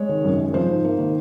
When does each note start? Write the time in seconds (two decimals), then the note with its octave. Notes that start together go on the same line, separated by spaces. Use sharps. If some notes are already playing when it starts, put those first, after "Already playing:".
Already playing: G#3 C#5
0.09 D#3
0.24 F#2
0.39 G#3
0.54 F3 C5
0.69 G#2
0.84 A#3
0.99 D#3